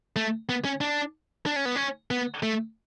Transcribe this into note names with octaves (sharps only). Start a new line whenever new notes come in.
A3
B3
C#4
D4
D4
C#4
B3
C#4
B3
A3